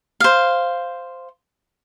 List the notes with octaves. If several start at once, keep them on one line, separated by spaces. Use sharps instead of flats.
C5 F5